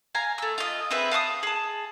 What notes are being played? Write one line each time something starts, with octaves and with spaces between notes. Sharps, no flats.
F5 G#5 A#5
A3 E6
F4 D#5
C4 G#4 B4 E5
F5 A5 C#6 D#6
G#4 A5